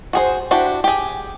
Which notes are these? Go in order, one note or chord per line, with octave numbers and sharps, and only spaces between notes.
F#4 G#4 C5
D4 E4 F#4 G4 C5
G4 G#4